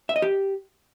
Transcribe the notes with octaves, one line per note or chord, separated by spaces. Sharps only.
E5
D#5
G4